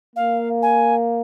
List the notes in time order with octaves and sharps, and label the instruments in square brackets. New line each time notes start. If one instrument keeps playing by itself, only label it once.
[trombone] A#3 [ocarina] F5
[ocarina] G#5